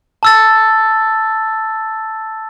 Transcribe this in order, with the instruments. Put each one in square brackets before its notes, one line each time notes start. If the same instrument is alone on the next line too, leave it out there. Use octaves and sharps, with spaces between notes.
[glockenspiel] A5 E6 A6